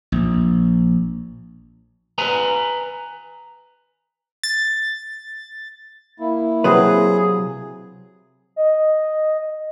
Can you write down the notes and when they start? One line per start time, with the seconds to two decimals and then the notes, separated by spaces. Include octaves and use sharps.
0.12 A#1
2.18 B4 G#5 A#5
4.43 A6
6.20 A#3 E4
6.64 C3 F#3 G#4 B4
8.56 D#5